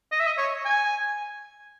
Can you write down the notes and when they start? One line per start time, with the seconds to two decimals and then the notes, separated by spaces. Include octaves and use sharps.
0.12 D#5
0.20 E5
0.27 D#5
0.38 C#5
0.65 G#5